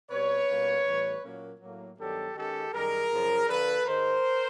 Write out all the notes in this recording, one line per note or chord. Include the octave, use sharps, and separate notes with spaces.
B2 G3 C4 B4 C#5
B2 G3 A#3 C#4
A2 E3 G3 B3
A#2 F#3 A#3 C#4
A2 F#3 A#3
G2 D#3 F#3 B3 D4 G4 A4
D#3 G#3 C#4 G4 A4
F#2 D#3 G3 G#4 A#4
F#2 C#3 F3
D3 F3 A#3 D4 A4 B4
G#2 D#3 G#3 A#4 C5